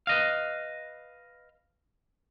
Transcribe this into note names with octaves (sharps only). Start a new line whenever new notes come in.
B4 D#5 F5